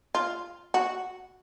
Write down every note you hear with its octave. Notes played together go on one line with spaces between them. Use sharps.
F4
F#4